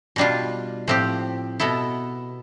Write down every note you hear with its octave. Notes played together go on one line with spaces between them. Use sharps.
B2 G3 D4 F4
A2 F3 C4 G4
B2 B3 E4 A4